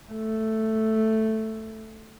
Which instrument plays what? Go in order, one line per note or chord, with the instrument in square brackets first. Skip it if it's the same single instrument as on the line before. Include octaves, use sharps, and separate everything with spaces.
[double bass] A3